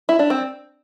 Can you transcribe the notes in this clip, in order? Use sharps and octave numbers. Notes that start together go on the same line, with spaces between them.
E4
D4
C4